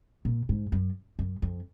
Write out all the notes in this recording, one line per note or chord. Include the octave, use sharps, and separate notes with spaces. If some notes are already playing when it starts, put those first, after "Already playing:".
A#2
G#2
F#2
F#2
F2